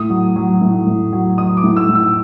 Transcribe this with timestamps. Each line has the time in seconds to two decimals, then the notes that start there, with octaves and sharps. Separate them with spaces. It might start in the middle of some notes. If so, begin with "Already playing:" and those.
Already playing: A2 D#6
0.10 F#3
0.36 F#3
0.61 A2
0.86 A2
1.12 F#3
1.38 F#3 D#6
1.57 D6
1.64 A2
1.77 E6
1.89 A2
1.95 E6